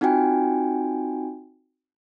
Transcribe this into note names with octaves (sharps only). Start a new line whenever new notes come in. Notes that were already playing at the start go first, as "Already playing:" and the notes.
C4 D#4 F4 F#4 G5 G#5